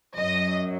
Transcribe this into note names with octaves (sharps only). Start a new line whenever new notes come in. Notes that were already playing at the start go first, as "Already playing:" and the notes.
F#2 F#3 D#5